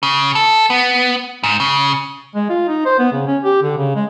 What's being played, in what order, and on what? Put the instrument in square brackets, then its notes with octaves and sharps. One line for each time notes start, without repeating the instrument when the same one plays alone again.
[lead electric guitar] C#3
A4
B3
G#2
C#3
[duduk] G#3
F4
D#4
C5
B3
C#3
C#4
G4
D3
C#3
G#3